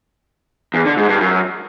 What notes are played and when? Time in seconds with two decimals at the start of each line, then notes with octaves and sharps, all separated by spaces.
0.74 E2
0.85 D3
0.97 G#2
1.09 G2
1.21 F#2